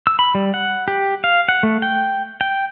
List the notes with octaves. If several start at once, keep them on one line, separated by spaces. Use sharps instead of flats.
E6
B5
G3
F#5
G4
F5
F#5
A3
G5
G5